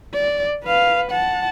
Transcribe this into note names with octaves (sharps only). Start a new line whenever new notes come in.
D5
B4 F5
F#5 A5